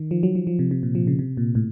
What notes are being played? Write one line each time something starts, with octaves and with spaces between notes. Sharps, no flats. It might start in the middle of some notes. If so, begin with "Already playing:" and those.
Already playing: D#3
F3
F#3
F3
F3
C3
C3
A#2
F3
C#3
C3
A#2
A2